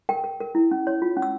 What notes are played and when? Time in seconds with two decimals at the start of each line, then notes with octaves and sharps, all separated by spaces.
0.09 A#4 G5
0.24 A#4
0.40 A#4
0.55 E4
0.71 C#4
0.87 C#5
1.02 F4
1.17 C#4
1.22 E6